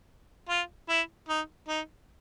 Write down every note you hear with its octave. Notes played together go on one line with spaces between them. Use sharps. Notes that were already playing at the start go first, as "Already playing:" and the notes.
F4
E4
D#4
D#4